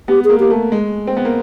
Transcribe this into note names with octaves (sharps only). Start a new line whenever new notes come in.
B3 G4
A#3 G#4
A#3 G4
A3
G#3
C4
B3
A#3